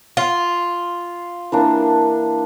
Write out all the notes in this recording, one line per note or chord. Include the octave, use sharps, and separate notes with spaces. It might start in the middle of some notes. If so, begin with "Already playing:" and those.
F4
E3 A#3 D4